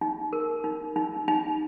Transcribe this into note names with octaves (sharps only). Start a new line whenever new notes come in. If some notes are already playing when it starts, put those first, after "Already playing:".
D#4
A#4
D#4
D#4
D#4